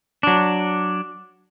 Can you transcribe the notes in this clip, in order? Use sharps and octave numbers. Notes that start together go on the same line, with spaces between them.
F#3 D4